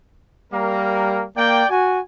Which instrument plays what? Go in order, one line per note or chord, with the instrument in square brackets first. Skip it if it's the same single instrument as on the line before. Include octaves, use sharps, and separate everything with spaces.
[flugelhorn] G3 [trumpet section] A#3 A#4
[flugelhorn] A#3 [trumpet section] D5 G5
[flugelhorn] F#4 [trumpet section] G#5